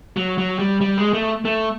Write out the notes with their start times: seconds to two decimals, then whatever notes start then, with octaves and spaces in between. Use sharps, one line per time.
0.17 F#3
0.38 F#3
0.59 G3
0.81 G3
0.98 G#3
1.13 A3
1.45 A3